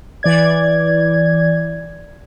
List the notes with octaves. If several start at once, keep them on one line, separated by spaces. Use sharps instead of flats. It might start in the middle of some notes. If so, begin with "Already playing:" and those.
E3 D5 G#6